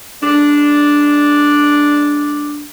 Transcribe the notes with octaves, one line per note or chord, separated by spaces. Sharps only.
G#3 D4